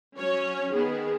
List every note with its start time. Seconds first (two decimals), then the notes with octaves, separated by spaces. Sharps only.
0.18 F#3 C#4 C#5
0.73 D#3 B3 G#4